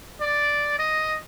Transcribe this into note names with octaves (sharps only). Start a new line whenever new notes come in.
D5
D#5